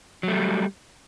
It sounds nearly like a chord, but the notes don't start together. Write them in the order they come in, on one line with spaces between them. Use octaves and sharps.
F#3 A3 G3